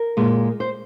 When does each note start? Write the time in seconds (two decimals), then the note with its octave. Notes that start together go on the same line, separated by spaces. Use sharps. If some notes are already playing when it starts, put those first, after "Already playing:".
Already playing: A#4
0.17 A#2 G#3
0.60 C5